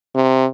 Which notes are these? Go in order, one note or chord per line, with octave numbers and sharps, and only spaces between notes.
C3